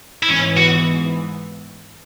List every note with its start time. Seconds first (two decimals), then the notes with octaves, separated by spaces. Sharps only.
0.23 E4
0.29 G#2 E3 B3 C#4
0.57 F#4